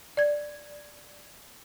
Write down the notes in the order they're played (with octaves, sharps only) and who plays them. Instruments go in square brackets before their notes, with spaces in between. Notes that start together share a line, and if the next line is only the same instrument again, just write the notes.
[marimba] D5 G#6